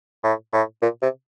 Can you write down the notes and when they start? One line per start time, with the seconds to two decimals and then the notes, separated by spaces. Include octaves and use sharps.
0.24 A2
0.53 A2
0.82 A#2
1.02 C3